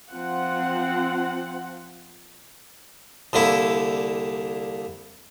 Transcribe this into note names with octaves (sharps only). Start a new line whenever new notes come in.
F3 C4 F4 F#5
C2 D3 A#3 E4